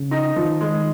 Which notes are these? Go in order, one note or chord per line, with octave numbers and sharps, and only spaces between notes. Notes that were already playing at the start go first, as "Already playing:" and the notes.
Already playing: C#3
D#4
D#3 F3
G#3